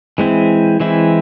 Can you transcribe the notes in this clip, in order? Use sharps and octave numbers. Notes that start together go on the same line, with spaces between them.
E3 G#3 C4 E4
E3 G#3 C4 E4